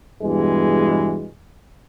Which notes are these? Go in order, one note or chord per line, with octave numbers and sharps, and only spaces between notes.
E2 G2 B2 E3 G#3